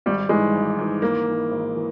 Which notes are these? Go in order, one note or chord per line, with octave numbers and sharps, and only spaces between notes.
G#1 G3
G#2 E3 G#3
G#1
G#2 E3
G#1 A#3
G#2 E3
G#1
E3